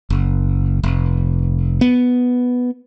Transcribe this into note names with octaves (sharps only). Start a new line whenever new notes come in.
F#1
F1
B3